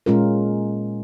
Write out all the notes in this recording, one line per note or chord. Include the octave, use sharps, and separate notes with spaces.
A#2 G#3 C#4 F4 A#4